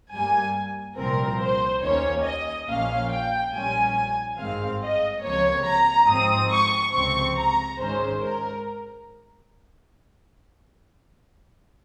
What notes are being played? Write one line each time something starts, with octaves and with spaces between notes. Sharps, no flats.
G2 G3 A#3 G#5
C2 A#2 F3 C4 A#4
C5
D#2 D#3 A#3 C#4 C#5
D#5
A#1 A#2 F3 A#3 C#4 F5
G5
A#1 A#2 G3 C#4 G#5
G#1 G2 D#3 G#3 C4 F5
D#5
C#2 C3 F3 A#3 C#5
A#5
G#1 G#2 F3 C4 D#6
C#6
C#2 C3 F3 C4 C#6
A#5
G#1 G#2 D#3 G#3 C#4 C5
A#4